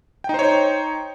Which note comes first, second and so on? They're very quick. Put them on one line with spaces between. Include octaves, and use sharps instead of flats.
G5 D#4 C5 C#5